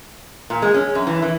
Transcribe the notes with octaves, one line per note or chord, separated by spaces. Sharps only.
A#2
G#3
C#4
F#2
E3
E3